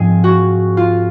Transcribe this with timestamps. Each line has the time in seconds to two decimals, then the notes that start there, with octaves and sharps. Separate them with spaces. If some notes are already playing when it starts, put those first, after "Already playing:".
Already playing: G#2 F3 C4 G#4
0.24 F#4
0.77 F4